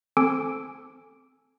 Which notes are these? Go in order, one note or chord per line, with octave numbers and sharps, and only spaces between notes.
C4 A4 G#5 D6 E6 D7